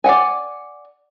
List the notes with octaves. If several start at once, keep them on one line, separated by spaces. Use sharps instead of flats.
D5 E5 F#5 G#5